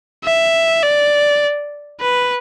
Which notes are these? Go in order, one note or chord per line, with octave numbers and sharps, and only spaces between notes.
E5
D5
B4